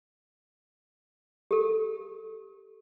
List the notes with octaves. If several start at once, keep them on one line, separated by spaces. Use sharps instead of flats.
G4 A4